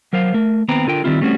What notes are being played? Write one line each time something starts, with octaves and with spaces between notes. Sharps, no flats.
F#3 A#4 C5 F5
A3 A#4
D#2 B3 C4 B4 G5 A#5
D3 F4 A#4 G5
D#3 F3 G3 C4 E4 F4
G3 A3 C4 C#4 F#4